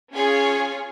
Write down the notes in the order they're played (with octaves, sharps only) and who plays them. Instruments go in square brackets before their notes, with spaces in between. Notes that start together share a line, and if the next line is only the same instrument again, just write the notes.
[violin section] C#4 F4 G#4 C#5 G#5